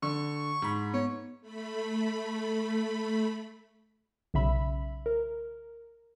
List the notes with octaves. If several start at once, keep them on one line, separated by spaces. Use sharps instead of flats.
D3 C#6
G#2 B5 C6
B3 C#5
A3 B5
B1 C#3 E5 B5
A#4